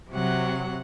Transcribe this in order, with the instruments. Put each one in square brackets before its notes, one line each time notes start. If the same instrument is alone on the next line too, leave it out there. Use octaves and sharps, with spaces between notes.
[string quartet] C3 F#3 F#5